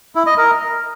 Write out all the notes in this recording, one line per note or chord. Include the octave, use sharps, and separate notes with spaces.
E4
D#5
A#4